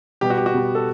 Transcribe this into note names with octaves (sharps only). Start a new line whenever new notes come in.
B2 G3 B3 G4
F#4
G4
F#4
B2 G3 B3
A4